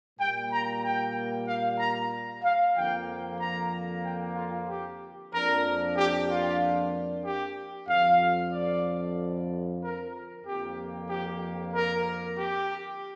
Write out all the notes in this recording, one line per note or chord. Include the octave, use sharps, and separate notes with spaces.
A#2 G3 A#3 G5
A#5
G5
F5
A#5
F5
F2 D3 F3 A#3 G5
A#5
G5
F4
G4
F2 F3 A#3 D4 A#4
G4
F4
G4
F2 D3 F3 F5
D5
A#4
F2 D3 F3 A#3 G4
G4
A#4
G4